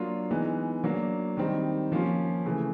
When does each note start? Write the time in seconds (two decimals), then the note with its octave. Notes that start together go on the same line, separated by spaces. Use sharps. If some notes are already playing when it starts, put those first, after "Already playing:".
Already playing: F#3 A#3 D4 F4
0.31 E3 G#3 B3 D#4
0.84 F#3 A#3 D4
1.37 D#3 G3 C4 D#4
1.92 F3 A#3 C#4 F4
2.46 C#3 E3 A3